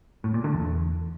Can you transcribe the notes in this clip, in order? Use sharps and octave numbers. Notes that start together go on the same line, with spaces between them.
A2
A#2
D3
E2